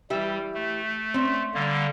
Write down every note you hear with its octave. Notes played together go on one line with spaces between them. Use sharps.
E3 G3 G4 E5
A3
C4 C#4
D3 G3 A#3